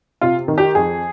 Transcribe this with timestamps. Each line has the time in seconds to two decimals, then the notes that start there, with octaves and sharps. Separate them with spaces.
0.21 C3 F4
0.48 D#3
0.58 G4
0.75 F2 G#4